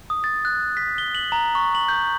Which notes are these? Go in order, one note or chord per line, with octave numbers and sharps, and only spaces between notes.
D#6
A6
F#6
B6
G7
F#7
A#5
C#6
F#7
G6